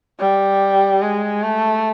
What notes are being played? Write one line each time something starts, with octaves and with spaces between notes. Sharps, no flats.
G3
G#3
A3